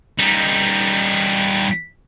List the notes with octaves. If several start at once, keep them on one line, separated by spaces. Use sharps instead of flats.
G3 D#4